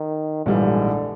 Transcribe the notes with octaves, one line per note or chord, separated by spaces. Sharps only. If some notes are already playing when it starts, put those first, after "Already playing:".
Already playing: D#3
A#1 G#2 D3 E3 G3